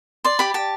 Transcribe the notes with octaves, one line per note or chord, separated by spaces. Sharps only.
D5 C6
G4 B5
G4 A5